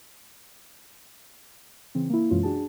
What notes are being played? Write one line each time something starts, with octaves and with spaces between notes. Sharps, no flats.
C#3 E3 C4
A#3 E4
F#2 B2 E3 G#3 C#4 F4
D4 F#4 G#4 A5